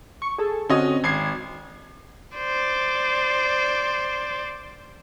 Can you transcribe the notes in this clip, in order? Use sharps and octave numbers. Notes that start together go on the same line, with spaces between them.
C#6
G#4 A4
D3 C4 C#4 F#4 D#5 D#6
G#1 G#6 C7
C5 D5